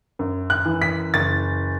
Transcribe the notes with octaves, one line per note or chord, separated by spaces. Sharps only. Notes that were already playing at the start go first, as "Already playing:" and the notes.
F#2
F#6
E3
B6
F#1 A6